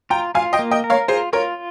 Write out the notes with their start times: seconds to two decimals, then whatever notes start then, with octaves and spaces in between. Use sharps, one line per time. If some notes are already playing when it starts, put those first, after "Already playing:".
0.10 F4 G5 A#5
0.35 F4 F5 G#5
0.53 D#5 G5
0.59 A#3
0.71 D#5 G5
0.84 A#4
0.90 C#5 F5
1.08 F4 G#4 C5
1.33 F4 A#4 C#5